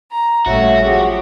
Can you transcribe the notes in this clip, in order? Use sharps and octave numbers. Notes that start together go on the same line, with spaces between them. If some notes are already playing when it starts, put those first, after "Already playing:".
A#5
A1 A#2 G3 A3 C#4 F#4 C#5 E5
F3 F#3 G4 G#4